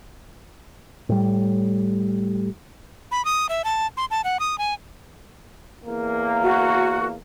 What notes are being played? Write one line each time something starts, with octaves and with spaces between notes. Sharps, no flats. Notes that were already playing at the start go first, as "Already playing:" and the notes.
A2 G3
B5
D#6
E5
A5
C6
A5
F#5
D#6
G#5
E2 A#3
F#4